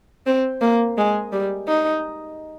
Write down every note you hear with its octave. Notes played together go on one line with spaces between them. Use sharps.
C4
A#3
G#3
G3
D#4